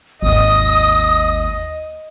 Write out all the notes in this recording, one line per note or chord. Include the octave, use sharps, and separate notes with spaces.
G#1 D#2 D#5 D#6